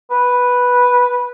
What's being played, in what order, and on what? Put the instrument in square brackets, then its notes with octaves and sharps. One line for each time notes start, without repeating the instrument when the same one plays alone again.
[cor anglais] B4